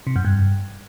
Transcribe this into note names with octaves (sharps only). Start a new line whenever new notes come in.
C3
F#2
G2